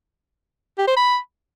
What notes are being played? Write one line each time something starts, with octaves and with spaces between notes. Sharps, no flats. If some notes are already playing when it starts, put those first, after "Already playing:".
G4
C5
B5